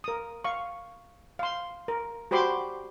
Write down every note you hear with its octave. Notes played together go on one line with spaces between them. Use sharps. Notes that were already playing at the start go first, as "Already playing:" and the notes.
A#4 D#6
F5 C#6
F5 C6
A#4
F#4 G4 C5 B5 C6 D6